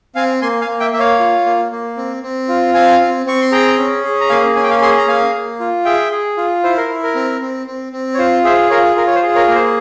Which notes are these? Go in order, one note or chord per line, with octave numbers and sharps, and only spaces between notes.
C4 F5 G#5
A#3 G#5 C6
F5 G#5
A#3
E5 G5
A#3 E5
C#5 F5
F4
A#3
A#3
C4
C4
F4
C4 F5 G#5
C4
C4 C#6
C6
G#4 G5 A#5
C#4
G#4
A#5
A#3 F5 G#5
C#4 G#5
G5
F5 G#5
G#4 G#5 C6
A#5
A#3 F5 G#5
A#3
F4
G#4 E5 G5
G#4
F4
E4 C5
A#4
E4
A#4
C4
C4
C4
C4
C#5
F4 C5
G#4 C5 E5
F4 A#4 C#5
F4 A#4
C#5
C5
G#4
A#4 C#5
A#3 A#4
C5